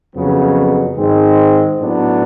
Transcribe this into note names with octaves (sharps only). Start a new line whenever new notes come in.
F2 C#3 F#3 B3
G#2 D#3 G#3 C4
A2 F#3 B3 D4